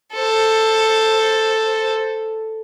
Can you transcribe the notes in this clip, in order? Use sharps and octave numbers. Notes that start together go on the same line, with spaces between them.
A4 C5